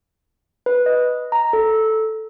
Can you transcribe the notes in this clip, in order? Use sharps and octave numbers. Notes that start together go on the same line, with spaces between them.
B4
D#5
A#5
A4